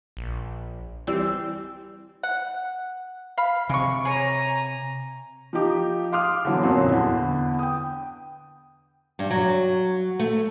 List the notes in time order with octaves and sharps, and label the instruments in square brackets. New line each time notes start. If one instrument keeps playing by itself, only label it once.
[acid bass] A#1
[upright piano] E3 G3 E6 [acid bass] C4
[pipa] F#5
F5 B5
[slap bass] C3 [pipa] G#3 C#6
[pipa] G#4 C#5 [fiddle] G#5 A#5
[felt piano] F3 D#4 G4
F5 C6 D6 D#6 F6
D3 E3 F#3 B3
F2 A#2 F#3 C4 C#4 C6
E2 D3 E3 B3
G5 D#6
[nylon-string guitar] G2
F#3
A3